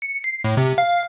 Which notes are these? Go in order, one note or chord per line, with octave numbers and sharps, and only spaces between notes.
C#7
C7
A2
C3
F5